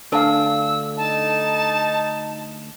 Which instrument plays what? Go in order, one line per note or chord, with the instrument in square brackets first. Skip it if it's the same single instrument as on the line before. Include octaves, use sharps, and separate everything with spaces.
[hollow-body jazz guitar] D2 D4 G#5 [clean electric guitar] A4 F5 [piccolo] E6
[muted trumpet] D#4 [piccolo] A5